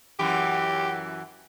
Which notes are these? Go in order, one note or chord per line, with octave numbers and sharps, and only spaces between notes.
F#2 E3 G4